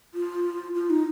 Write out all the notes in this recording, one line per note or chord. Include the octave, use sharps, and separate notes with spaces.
F4
F4
D#4